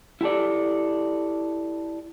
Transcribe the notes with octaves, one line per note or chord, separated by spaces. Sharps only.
E4 G4 A4 D5